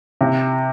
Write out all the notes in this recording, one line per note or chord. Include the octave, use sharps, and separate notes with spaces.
C3